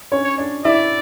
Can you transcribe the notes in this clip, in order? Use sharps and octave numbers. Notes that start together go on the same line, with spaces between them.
C#4 C#5
C#5
D4 D5
E4 D5 E5